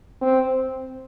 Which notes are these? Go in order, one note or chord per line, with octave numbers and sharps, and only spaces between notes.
C4